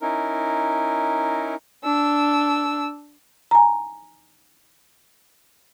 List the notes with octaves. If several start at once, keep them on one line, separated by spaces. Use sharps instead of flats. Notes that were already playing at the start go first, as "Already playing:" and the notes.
C#4 D#4 E4 A#4
D4 E6
G#5 A#5